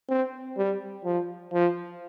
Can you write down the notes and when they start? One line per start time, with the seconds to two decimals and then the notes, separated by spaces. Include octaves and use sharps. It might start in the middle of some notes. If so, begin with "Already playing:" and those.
0.08 C4
0.57 G3
1.04 F3
1.53 F3